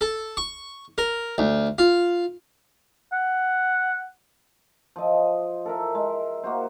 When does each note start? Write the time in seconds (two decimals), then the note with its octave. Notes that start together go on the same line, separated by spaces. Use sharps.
0.01 A4
0.37 C#6
0.98 A#4
1.38 D2
1.78 F4
3.13 F#5
4.96 F3 D#5
5.66 A4 A#4 E5
5.95 G#3
6.43 A#3 F#4 C5